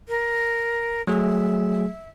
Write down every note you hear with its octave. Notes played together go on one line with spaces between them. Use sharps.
A#4
F#3 A3 G#4 E5